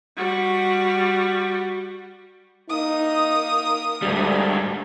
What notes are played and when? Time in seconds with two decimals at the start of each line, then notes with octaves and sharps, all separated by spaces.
0.17 G3 F#4
2.70 A#3 D#4 D#6
4.02 D2 G#2 G3